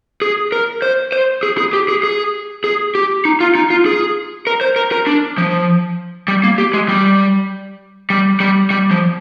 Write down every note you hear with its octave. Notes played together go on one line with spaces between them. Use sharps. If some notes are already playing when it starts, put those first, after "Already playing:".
G#4
A#4
C5
C5
G#4
G#4
G4
G#4
G#4
G#4
G4
D#4
F4
D#4
F4
G#4
A#4
C5
A#4
A#4
D4
F3
G3
A#3
G4
G#3
G3
G3
G3
G3
F3